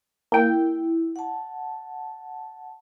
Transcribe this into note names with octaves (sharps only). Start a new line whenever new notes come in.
A#3 E4 G5
F#5 A5